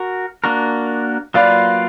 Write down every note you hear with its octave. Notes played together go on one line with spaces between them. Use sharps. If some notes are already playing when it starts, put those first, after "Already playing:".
Already playing: F#4 A#4
A#3 D4 F#4 A#4
F#3 A#3 F4 B4 D5 F5